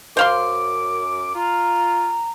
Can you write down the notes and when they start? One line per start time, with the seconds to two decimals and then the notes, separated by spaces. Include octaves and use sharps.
0.17 F#2 C5 F5 C6 D6
1.35 F4 A#5